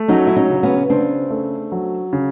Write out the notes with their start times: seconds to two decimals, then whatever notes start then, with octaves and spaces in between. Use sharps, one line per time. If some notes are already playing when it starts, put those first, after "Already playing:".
Already playing: A3
0.08 F#3 C#4 D#4
0.27 E4
0.36 C#4 D#4
0.50 C#3
0.63 B3 C#4
0.90 C#3 C4 D4
1.31 A3
1.72 F#3
2.13 C#3